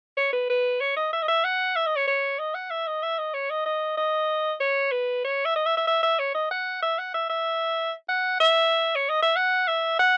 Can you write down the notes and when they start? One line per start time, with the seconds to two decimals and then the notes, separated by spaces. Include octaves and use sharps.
0.17 C#5
0.33 B4
0.50 B4
0.80 C#5
0.96 D#5
1.13 E5
1.22 D#5
1.28 E5
1.44 F#5
1.76 E5
1.86 D#5
1.97 C#5
2.07 C#5
2.39 D#5
2.54 F#5
2.70 E5
2.87 D#5
3.03 E5
3.18 D#5
3.34 C#5
3.50 D#5
3.66 D#5
3.97 D#5
4.61 C#5
4.92 B4
5.24 C#5
5.45 E5
5.56 D#5
5.66 E5
5.77 E5
5.87 E5
6.03 E5
6.19 C#5
6.35 D#5
6.51 F#5
6.82 E5
6.98 F#5
7.14 E5
7.30 E5
8.09 F#5
8.40 E5
8.95 C#5
9.09 D#5
9.22 E5
9.36 F#5
9.67 E5
9.99 F#5